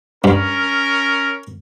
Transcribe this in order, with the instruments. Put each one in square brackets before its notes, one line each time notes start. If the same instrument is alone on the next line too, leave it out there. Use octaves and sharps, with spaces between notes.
[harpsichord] G2 [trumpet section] C#4 A#4